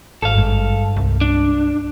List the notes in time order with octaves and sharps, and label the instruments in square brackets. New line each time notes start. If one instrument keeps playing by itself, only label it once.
[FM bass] G#1 [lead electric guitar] A4 F5
[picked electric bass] G2 G#3
[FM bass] C2
[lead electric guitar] D4